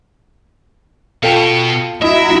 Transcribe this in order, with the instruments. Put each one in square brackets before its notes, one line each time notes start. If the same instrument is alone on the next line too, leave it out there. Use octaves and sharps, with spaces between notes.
[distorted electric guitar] B2 B3 [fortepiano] F4 A4 G5
[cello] E4 [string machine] F#4 A#5 [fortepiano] D#5 [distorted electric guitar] E5